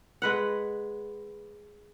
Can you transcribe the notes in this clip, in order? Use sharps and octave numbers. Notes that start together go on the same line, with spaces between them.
G#3 B4 F#5